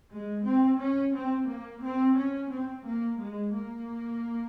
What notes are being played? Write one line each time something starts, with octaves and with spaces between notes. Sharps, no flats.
G#3
C4
C#4
C4
A#3
C4
C#4
C4
A#3
G#3
A#3